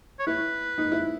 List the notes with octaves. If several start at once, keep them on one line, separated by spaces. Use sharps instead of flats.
C#5
E4 B4
D#4
E4